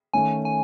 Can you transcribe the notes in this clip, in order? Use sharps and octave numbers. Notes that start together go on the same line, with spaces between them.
D#3 A3 C#4 G#5
G#5